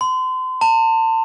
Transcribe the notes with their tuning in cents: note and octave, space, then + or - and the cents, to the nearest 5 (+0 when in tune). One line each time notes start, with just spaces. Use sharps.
C6 -35
A5 +40